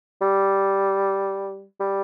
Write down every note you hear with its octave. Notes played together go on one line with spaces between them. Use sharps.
G3
G3